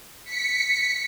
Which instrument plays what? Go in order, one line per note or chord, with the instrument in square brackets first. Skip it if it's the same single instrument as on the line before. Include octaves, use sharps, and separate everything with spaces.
[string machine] B6 C#7